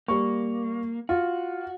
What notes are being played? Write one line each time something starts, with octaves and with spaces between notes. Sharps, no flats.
G3 A#3 C#6
F4 F#4